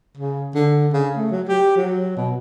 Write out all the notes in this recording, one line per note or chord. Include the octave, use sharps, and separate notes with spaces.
C#3
D3
C#3
A3
F#3
G4
F#3
B2